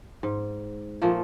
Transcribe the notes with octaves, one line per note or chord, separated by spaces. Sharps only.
G#2
A#2 F3 A3 A#3